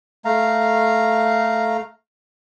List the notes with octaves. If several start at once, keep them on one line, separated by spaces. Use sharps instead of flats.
A3 F5 A#5